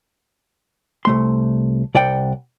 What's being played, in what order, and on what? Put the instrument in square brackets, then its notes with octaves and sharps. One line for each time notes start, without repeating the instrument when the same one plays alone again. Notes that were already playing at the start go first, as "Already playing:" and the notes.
[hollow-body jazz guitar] C2 A3 C6
C2 D5 F#5 G5